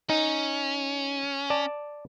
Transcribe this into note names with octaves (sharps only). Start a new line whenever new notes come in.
C#4 D#4
D5 A5